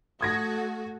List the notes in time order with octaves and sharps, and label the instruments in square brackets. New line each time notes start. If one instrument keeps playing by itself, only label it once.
[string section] A3 F#4 [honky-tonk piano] D#6 G#6 A#6